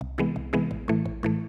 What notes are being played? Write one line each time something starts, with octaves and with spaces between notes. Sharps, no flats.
C2
C3 E3 G#3 B3
C2
C3 E3 G#3 B3
A1
A2 E3 A3
A1
A2 E3 A3